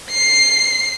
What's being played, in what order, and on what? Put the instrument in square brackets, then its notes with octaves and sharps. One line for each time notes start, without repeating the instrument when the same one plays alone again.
[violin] C7